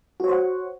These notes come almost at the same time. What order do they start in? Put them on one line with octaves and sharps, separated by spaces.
F#4 C#5 C5 F#5